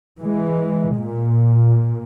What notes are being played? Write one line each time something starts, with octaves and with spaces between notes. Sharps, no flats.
E3 G#3
A#2